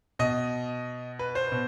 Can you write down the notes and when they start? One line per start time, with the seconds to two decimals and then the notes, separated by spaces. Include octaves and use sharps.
0.19 B2 D#5
1.19 B4
1.35 C5
1.52 B2